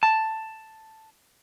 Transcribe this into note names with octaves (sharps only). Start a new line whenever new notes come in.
A5